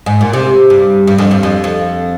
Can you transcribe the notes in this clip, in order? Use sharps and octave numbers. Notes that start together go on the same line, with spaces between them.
G#2
A#2
C3
G2
G2
F2
G2
F2
F2